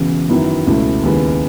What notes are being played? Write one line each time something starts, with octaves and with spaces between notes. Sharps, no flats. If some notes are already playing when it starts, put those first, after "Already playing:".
Already playing: E1 E2 C#3
F#2 D#3 F#3 B3 E4
C#2 B2 A3 C#4 E4
D#2 C#3 G#3 B3 E4